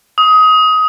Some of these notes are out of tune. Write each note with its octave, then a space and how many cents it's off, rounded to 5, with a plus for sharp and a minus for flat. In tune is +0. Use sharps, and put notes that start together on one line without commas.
D#6 +20